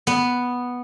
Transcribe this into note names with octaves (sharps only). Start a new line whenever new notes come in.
B3